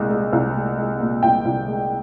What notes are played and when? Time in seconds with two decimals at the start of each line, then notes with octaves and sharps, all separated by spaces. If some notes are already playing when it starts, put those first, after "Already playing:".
Already playing: C2 A#2 G#3
0.11 G#3
0.33 C2
0.55 G#3
0.78 G#3
1.00 A#2
1.23 C2 G5
1.45 C2
1.67 G#3